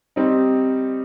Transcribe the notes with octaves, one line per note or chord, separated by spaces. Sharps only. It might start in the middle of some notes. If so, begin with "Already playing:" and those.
G3 C4 D#4